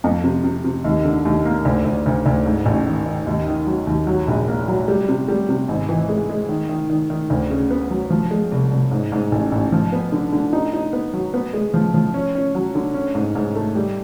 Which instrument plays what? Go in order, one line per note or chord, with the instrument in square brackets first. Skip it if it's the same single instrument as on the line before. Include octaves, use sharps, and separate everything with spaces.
[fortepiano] F2
C3
C3
C3
D#2
D3
D#2
A#3
D2
D2
D2
D2
G#2
A1
D#3
D#3
D#2
D#3
F#3
D#2
F#3
A#1
A#3
F#3
G3
C3
G3
C3
G#1
E3
G#3
G#3
D#3
D#3
D#3
D#3
D2
C#3
B3
F#3
F3
G#3
C2
C2
G#2
G#2
A1
A1
F3
B3
D3
D3
D#4
D#4
B3
F#3
B3
G#3
F3
F3
C#4
C#4
F#3
D3
C#4
G#2
G#2
A3
G3